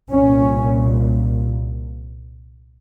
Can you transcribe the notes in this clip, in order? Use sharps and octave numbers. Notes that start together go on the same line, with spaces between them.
C2 A#2 C#4